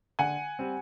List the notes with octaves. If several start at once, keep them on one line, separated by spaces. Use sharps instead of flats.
D3 F#5 G#5
G3 C4